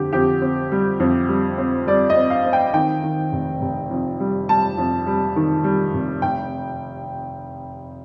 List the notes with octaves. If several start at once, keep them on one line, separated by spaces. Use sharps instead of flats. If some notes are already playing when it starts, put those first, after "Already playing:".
Already playing: F2 D3 C4 G4
F2 G4
C4
G3
F2
G3
C4
G3 D5
D#5
C4
F5
C4
G5
D#3 G5
D#3
F1
F1
F2
G3
G3 A5
F2
G3
D#3
G3
F1
F1 G5